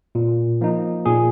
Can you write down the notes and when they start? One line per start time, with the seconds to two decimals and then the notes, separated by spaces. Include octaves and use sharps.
0.15 A#2
0.61 F3 A#3 D#4
1.06 A#2 G#4